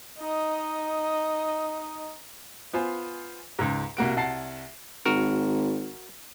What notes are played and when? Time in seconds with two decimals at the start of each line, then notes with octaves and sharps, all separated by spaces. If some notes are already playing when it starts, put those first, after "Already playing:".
0.18 D#4 D#5
2.73 B3 F4 C5 G#5
3.59 C#2 G#2
3.97 C2 A#3 F#4 D7
4.17 C2 F#5 A5 A6 C7
5.06 G#1 F#4 A#4